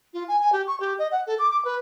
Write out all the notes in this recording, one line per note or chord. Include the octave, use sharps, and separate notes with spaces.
F4
G#5
G#5
G4
C#6
G4
D#5
F#5
A4
D6
D6
B4